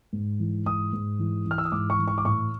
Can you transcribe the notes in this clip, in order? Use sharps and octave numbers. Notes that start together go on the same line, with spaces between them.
G#2
E3
G#2 D#6
G#2
E3
E3
F6
E6
D#6
G#2 D6
C#6
E3
C#6
D6
A2 C#6